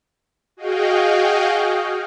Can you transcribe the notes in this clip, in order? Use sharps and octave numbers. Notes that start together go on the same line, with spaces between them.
F#4 G#4 D#5 F5 G5